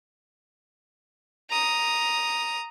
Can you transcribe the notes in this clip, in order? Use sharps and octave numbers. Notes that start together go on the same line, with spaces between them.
A#5 D#6